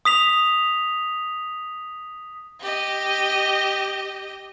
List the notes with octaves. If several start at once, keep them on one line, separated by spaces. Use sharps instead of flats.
D#6 B6 F7
G4 D#5